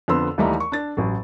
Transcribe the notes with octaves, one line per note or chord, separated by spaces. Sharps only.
F2 D3 B3 C6 E6
D#2 E3 G3 A3 D#4
C#6
D4 A6
A1 F#3